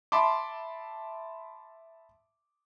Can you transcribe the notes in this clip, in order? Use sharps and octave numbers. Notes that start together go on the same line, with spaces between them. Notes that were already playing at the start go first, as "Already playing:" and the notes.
E5 A5 B5 C6 D6